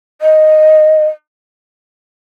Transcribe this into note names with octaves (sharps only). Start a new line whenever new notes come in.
D#5